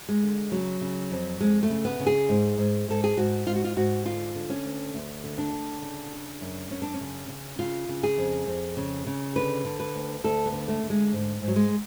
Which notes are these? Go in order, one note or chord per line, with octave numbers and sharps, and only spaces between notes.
G#3
D3
C#3 F#3
C#3
F2
F2 G#3
A3
C#3
B3
C#3
G#4
G#2
G#2
G#2 A4
G#4
G#2 F#4
G#2 F4
F#4
F4
G#2 F#4
D3 F4
D3
C#4
D2
D2
D3
D4
D3
C#3
C#3
F#2
F#2 C#4
D4
C#4
C#3
C#3
C#3 F4
C#3
G#4
F2
F2
C#3
C#3
D3 B4
D3
B4
D2
D2 A4
B3
D3
A3
D3
G#3
G#2
G#2
F#3
G#3